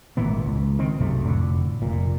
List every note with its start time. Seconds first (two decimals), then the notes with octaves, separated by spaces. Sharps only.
0.17 G#1 A#2 E3 B3
0.43 C#2
0.79 D#3 C4
0.99 B1 F#2 C3 A3
1.25 F1 A2 D3
1.82 F1 A#2